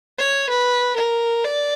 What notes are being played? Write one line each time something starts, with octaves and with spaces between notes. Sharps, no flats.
C#5
B4
A#4
D5